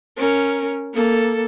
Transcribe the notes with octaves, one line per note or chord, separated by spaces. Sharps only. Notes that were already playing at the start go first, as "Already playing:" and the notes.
C#4 A#4
A#3 A4